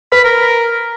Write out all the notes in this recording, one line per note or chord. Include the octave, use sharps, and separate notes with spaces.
B4 B5
A#4